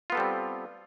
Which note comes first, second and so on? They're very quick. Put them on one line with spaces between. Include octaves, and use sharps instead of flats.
F4 B3 A4 G3 C4